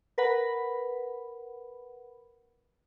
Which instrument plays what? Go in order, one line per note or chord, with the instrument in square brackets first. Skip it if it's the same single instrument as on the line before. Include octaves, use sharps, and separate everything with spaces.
[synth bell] A#4 B4 F#5 B5